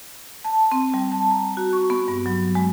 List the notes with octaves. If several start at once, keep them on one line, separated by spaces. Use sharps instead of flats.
A5
C4
G3
A5
A#5
F#4
C#6
B3
G2
F#3
G#3